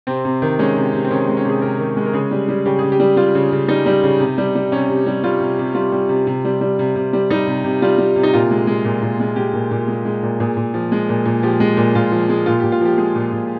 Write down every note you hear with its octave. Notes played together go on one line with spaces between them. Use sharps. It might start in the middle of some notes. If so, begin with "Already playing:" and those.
C3 C4
C3
D#3
G#3 C#4
C3
C3
C4
D#3 C#4
G#3
C#4
C3 G#4
C3 A#4
D#3
G#3
A#4
C#3 G#4
G3
G3
C#3 G4
C#3 G#4
G4
G3
G3 F4
C#3
C#3
G3 D#4
G3
C#3
C3
G3
G3
C3 C#4
C3
G3
G3 F4
C3
C3
G3 F4
G3
C3
C3
G3
G3
C3
C3
G3
G3 D#4
C3
C3
G3 F4
G3
C3
D#4
A#2 F4
G#3
G#3
A#2
A#2
G#3
G#3 G4
A#2
A#2
G#3
G#3
A#2
A#2 G#4
A#2
F3
G#3
A#2
A#2
F3 G4
G#3
A#2
A#2 F4
F3
G#3
A#2 F4
A#2 G4
F4
F3 G4
G#3 G#4
A#2
A#2